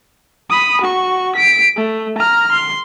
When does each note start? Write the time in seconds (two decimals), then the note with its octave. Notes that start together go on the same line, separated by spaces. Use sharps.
0.50 B5 D#6
0.82 F#4 C#6
1.36 B6 D7
1.77 A3
2.18 A#5 F6
2.52 C6